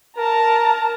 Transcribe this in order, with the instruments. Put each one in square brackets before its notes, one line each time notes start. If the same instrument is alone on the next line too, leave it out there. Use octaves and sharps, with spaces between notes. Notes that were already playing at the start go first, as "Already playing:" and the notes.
[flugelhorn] A#4 [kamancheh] A5 A#5